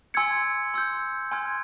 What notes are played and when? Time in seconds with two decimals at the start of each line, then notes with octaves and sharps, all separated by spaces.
0.14 G#5 C6 E6 G#6 C#7
0.74 C6 E6 G6
1.31 G#5 C6 F6 G#6